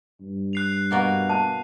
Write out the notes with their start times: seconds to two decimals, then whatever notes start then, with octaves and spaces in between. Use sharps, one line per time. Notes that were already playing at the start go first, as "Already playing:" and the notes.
0.21 G2
0.53 F#6 C7 F7
0.91 B2 A#3 F#4
1.30 A5